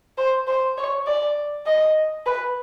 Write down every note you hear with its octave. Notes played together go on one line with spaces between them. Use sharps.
C5
C5
C#5
D5
D#5
B4